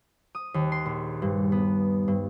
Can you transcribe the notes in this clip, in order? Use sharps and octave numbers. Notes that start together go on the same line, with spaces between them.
D#6
D#2
C6
A#1
G2
B3
G2